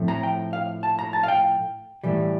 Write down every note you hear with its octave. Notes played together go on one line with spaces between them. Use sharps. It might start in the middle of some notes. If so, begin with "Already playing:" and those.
Already playing: A2 F3 A3 C4
A#5
G5
F5
A5
A#5
A5
F5
G5
A2 E3 G3